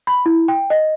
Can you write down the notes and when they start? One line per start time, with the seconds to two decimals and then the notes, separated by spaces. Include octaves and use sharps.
0.07 B5
0.26 E4
0.48 G5
0.70 D#5